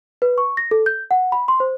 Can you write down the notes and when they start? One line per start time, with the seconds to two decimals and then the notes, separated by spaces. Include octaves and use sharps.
0.22 B4
0.38 C#6
0.57 A#6
0.71 A4
0.86 G6
1.11 F#5
1.32 B5
1.48 C6
1.60 C5